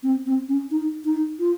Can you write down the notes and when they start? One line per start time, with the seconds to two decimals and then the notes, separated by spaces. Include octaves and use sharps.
0.03 C4
0.26 C4
0.48 C#4
0.71 D#4
1.05 D#4
1.39 F4